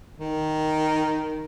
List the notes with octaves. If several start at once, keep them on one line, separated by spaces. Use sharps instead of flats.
D#3